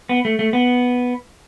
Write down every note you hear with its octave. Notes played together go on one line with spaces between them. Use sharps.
B3
A3
A3
B3